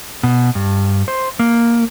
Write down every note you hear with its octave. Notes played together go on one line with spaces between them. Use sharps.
B2
G2
C5
A#3